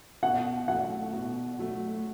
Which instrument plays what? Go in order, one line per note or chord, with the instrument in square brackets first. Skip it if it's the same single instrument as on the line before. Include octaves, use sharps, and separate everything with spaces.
[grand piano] B2 [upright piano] F#5
[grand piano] F#3 A3 [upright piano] F#5
[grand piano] B2
F#3 A3